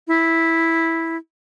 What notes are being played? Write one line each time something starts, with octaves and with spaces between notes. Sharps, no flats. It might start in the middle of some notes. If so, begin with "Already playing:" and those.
E4